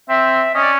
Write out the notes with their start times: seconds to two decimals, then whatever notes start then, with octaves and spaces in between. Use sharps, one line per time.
0.09 C4 E5
0.55 C#4 D#5
0.63 D5